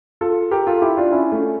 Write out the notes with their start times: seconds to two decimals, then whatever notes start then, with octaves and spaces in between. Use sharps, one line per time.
0.21 F4 A4
0.51 G4 A#4
0.67 F4 A4
0.82 E4 G4
0.97 D4 F4
1.12 C#4 E4
1.32 A3 C#4